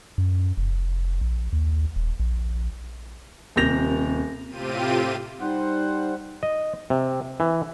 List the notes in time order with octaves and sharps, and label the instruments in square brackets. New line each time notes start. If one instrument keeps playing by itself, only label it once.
[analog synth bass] F#2
F1
A#1
D#2
D#1
A#1
[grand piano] D#1 C3 A#3 G6 A#6 F7
[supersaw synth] A2 C3 C4 F4 G4 D#7
[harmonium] G3 C5 F#5 [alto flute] D#4
[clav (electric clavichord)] D#5
C3
E3